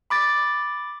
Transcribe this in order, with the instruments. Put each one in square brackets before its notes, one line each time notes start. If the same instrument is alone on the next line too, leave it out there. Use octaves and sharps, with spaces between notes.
[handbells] B5 D6 A6